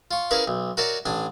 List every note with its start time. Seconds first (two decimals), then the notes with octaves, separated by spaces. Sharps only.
0.11 F4 C#6
0.31 C#4 E4 G#4 A#4 B4 F5
0.48 B1
0.77 F#4 A#4 C#5 D5 E5 G#5
1.06 A1 D4 G#5